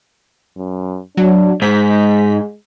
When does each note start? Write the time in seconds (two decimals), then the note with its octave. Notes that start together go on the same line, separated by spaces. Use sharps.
0.57 F#2
1.17 F#3 D4
1.62 G#2 G#3 B6